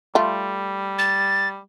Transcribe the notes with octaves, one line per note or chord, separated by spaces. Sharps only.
G3 A3 F4
A6